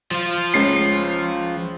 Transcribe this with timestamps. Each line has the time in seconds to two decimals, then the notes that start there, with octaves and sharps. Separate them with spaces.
0.11 F3 F4
0.54 C#2 C#4 C7